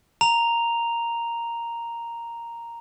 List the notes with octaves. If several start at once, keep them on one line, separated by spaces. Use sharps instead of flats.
A#5 F7